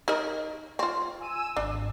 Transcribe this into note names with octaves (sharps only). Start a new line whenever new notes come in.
D#4 A#4 D#5
C4 F4
G#5 E6 D#7
G#1 D4